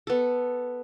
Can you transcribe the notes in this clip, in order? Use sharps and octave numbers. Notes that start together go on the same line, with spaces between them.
B3 A4